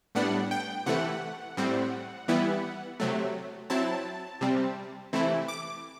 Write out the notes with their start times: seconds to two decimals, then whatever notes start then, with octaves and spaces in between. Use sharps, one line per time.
0.15 A2 G3 B3 D4 F#5
0.51 G5
0.86 C3 E3 A3 F#5
1.57 A2 G3 C4
2.28 E3 G3 B3 E4
3.00 C3 F#3 A3
3.70 F#3 C4 E4 A5
4.41 C3 G3 C4
5.13 C3 E3 A3 E4
5.48 D6